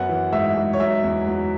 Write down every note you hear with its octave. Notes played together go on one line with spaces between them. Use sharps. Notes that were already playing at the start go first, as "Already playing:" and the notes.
Already playing: F#2 B3 F#5
E3
G#2 E5
G#2
C#5
F#3 E5
E2
F#3